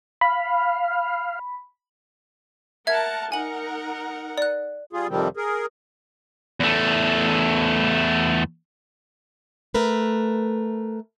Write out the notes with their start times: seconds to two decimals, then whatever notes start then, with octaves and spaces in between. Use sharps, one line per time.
0.21 F5 B5
2.87 A#4 E5 F#5 A5 G#6
3.32 D#4 A#4 F#5 G#5 F#7
4.38 D5 F#6
4.93 G3 F4 G#4
5.09 F2 C3 D#3 F3 G3 C4
5.37 G#4 A#4
6.60 E2 A3
9.75 A3 A#4 B4